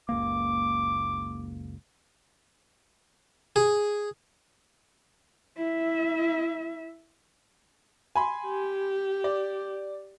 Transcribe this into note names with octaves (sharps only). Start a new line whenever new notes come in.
F#1 C#2 A#3 D6
G#4
E4 E5
G#5 B5 C6
G4
D5